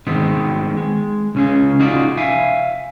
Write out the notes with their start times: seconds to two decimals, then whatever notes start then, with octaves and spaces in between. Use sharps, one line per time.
0.07 D#3 G#3 B3 C4
0.77 G#3
1.35 C#2 C#4 G#4
1.80 D#4 F4 F#4 G#4 D5
2.17 E5 F5 G#5